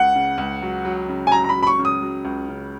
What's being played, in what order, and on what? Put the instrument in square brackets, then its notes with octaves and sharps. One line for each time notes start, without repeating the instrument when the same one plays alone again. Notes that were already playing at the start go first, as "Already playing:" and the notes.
Already playing: [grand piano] C#2 [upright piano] F#5
[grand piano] C#3
C#2
F#3
F#3
C#3
[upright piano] G#5
[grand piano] F#3 [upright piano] A#5
[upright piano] A#5
B5
[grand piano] F#3
[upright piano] B5
C#6
[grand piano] C#3
[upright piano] D#6
[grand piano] F#3
C#2
C#3